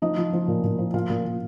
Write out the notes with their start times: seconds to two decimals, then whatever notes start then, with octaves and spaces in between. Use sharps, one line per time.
0.02 F3 D#4 D#5
0.17 F3
0.33 F3
0.48 A#2
0.64 A#2
0.79 F3
0.94 A#2 F4 F5
1.10 A#2
1.25 A#2